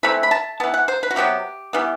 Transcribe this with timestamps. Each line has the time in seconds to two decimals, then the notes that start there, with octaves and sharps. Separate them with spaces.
0.03 E3 A3 C4 B5
0.23 B5
0.31 A5
0.60 E3 B3 A5
0.74 F#5
0.88 C5
1.03 B4
1.11 F#4
1.16 C3 F#3 B3 G4
1.73 E3 G3 B3